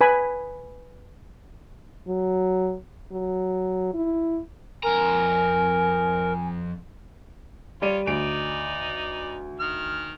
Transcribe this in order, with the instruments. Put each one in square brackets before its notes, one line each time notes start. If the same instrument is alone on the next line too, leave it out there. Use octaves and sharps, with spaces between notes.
[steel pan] B4 G#5 B5
[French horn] F#3
F#3
E4
[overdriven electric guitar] F2 A#5 [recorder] A#4 [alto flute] G#5
[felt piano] G3 D5 D#7 [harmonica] F4 C#5
[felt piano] D2 D7 [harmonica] D#4 D5
[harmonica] D#3 F6